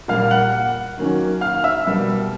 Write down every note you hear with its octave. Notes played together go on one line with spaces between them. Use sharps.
A#2 G3 A#3 F5 F6
F#5 F#6
D#3 F#3 A#3 C#4
F5 F6
E5 E6
B2 G3 A#3